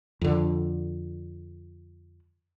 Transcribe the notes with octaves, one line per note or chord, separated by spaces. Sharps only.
F2 D3